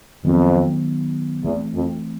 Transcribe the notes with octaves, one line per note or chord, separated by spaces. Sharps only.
F2 D#3 F#3 B3
E2 E3 A3 C4
F2